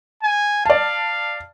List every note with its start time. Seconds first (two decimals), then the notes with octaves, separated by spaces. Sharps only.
0.23 G#5
0.66 D5 F5 A5